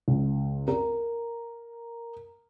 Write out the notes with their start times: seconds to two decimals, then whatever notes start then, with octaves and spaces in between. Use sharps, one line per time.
0.08 C#2
0.68 A#4